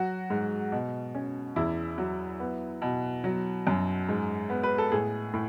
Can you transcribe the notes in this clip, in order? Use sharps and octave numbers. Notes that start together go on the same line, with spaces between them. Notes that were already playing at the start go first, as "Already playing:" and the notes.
Already playing: F#3 F#4
G#2
B2
C#4
E2 E4
F#3
B3
B2
F#3
F#2
G#2
B3
B4
A4
A2 G#4
A2